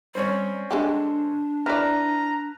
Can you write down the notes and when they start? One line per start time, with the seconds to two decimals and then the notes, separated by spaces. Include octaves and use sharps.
0.15 G3 C4 C#4 C#5
0.71 D3 G#3 D4 G4
1.66 E4 B4 D5 A#5 F6